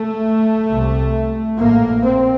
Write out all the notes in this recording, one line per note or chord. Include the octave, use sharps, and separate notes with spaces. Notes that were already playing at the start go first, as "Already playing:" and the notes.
Already playing: A3
C2 C3
A#1 A2 A#3
C4